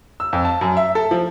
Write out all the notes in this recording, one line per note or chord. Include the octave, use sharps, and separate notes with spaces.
E6
F2
A5
F#2
E5
A4
F3